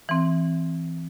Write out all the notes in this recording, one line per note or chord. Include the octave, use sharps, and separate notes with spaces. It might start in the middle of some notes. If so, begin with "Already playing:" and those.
E3 C4